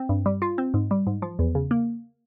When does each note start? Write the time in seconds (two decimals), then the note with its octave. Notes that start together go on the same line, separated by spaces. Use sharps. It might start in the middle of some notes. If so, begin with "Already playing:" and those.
Already playing: C4
0.09 G2
0.26 G3
0.42 F4
0.58 C4
0.74 G#2
0.91 G3
1.07 G#2
1.22 F3
1.39 E2
1.55 C#3
1.71 A#3